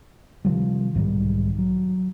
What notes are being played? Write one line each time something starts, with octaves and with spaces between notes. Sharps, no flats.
C3 D#3 F3 G3
B1 G#2 D#3 G3
F#3